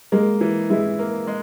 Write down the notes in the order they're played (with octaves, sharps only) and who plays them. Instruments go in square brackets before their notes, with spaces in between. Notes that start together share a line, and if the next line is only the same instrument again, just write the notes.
[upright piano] G#3 [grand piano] A#3
[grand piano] E3
[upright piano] G#3 [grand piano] E4
[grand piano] A#3
G#3